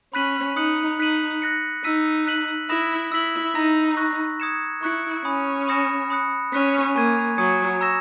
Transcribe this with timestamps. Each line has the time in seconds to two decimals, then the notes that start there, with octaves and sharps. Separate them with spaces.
0.14 C#4 B5 F#6 B6 D#7 F#7
0.56 D#4 D#6 F#6 C#7 F#7
0.99 D#4 F#6 B6 D#7 F#7
1.42 F#6 A#6 C#7
1.84 D#4 E6 B6 D#7
2.27 F#6 B6 D#7 F#7
2.69 E4 B5 D#6 A#6 E7
3.12 E4 E6 B6 F#7
3.55 D#4 A#5 E6 A#6
3.97 C#6 F#6 A#6
4.40 D#6 G#6 C#7 E7
4.82 E4 C#6 F#6 C#7
5.25 C#4 G#5 B5 D#6
5.68 B5 D#6 A#6 C#7 E7
6.10 B5 D#6 F#6 C#7
6.53 C#4 G#5 C#6 F#6 B6
6.95 A#3 G#5 C#6 G#6 D#7
7.38 F#3 G#5 D#6 G#6 C#7
7.81 A#5 C#6 E6 A#6 E7